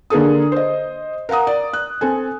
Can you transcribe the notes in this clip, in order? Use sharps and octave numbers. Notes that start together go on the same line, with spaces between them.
D3 A#3 G#4 A4 D#6
C5 D#5
A#4 F5 F#5 A#5 D#6
D5
F#6
C4 A4 G#5